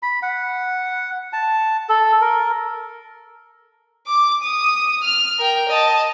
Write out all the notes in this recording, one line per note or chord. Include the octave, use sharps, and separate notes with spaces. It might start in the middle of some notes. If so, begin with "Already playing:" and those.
B5
F#5
A5
A4
A#4
D6
D#6
F6
A#4 G5
D#5 A5